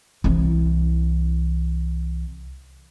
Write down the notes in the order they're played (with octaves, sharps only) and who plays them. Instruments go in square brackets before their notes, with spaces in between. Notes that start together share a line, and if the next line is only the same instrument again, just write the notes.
[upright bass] C2 E3